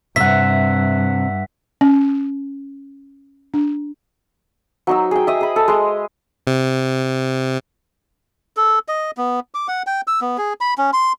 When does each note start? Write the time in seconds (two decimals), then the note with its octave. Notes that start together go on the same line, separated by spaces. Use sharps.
0.16 G2 C3 E5 F#5 B6
1.81 C#4
3.54 D4
4.87 F#3 D#4 E6
5.11 G#4 G5
5.27 D#5 E5
5.41 G#4 B5
5.56 A4
5.68 G#3 C6
6.47 C3
8.57 A4
8.88 D#5
9.17 B3
9.54 D6
9.68 F#5
9.87 G5
10.07 E6
10.21 B3
10.38 G#4
10.61 B5
10.78 C#4
10.93 C6